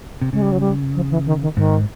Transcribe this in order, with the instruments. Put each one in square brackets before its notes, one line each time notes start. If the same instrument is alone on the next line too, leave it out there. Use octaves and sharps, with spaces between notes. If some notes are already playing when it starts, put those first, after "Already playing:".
[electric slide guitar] C3
[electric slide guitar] C#3 [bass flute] G#3
[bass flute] G3
F#3
G3
F3
E3
D#3
D#3
[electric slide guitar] G#2 [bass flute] D#3